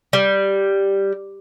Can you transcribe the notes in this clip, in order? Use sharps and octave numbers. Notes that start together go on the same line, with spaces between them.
G3